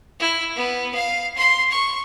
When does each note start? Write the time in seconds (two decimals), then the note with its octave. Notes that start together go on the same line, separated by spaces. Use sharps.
0.20 E4
0.56 B3
0.94 F5
1.37 C6
1.71 C#6